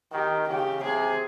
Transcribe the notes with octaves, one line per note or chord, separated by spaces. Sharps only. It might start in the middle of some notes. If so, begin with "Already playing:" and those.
D#3 G4
C#3 G4
C3 G#4